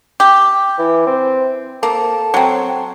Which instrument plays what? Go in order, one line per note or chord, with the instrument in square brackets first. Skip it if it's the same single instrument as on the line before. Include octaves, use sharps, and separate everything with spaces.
[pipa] G4
[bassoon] E3
C4
[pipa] A#3 [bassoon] A4
[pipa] F#3 C4